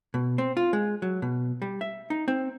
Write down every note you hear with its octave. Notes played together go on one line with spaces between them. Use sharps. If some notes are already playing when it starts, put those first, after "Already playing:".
B2
C4
F4
G#3
F#3
B2
G3
E5
D#4
C4